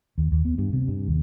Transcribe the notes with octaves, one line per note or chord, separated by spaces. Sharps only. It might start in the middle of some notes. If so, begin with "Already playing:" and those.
D#2
D#2
B3
G2
C3
G2
D#2